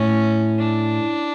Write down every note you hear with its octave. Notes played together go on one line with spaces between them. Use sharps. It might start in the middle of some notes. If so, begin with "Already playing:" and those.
Already playing: A2 C#4
D4